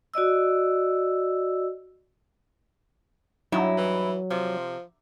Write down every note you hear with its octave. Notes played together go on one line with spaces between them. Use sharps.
F#4 D5 D#5 E6
G2 F#3 D#4 E4
E3
C3 F3